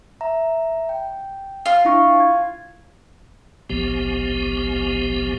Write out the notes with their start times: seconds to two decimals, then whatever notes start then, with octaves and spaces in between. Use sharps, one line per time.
0.21 E5 A#5
0.89 G5
1.66 F4
1.85 D4 E4 C#6
2.20 G#6
3.70 G#1 C#2 A#2 F3 B3 G4